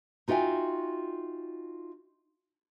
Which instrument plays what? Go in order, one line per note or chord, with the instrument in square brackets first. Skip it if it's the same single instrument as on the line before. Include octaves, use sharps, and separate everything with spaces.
[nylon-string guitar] D#4 F4 F#4 E5 G5 G#5